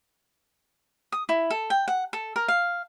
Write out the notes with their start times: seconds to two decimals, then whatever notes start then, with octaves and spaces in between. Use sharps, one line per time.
1.12 D#6
1.29 E4
1.50 A4
1.70 G5
1.88 F#5
2.13 A4
2.36 A#4
2.48 F5